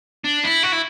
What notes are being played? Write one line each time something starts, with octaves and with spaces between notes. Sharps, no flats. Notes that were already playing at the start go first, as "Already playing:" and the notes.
D4
E4
F#4
E4